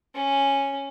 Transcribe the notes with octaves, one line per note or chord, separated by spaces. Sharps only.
C#4